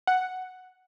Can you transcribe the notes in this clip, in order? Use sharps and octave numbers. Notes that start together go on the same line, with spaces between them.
F#5